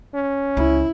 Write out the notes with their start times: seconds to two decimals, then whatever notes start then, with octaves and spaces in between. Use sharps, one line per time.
0.14 C#4
0.57 C#2 E4